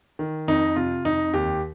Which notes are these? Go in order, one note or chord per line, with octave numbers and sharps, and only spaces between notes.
D#3
F2 D#4
C3 F4
F2 D#4
D#2 G4